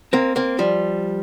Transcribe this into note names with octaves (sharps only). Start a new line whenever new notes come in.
A#3 C4
A#3 C4
F3 G3